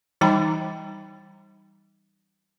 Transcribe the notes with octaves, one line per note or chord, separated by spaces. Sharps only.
E3 G3 D#4 G5 A#5 B5